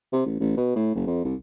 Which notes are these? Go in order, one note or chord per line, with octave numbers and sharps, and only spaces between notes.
C3
A1
A1
B2
A2
F#1
F2
C2